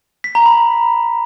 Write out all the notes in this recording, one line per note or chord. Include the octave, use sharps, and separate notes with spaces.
B6
A#5
B5